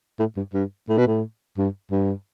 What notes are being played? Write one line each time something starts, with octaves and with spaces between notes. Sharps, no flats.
A2
G2
G2
A2
B2
A2
G2
G2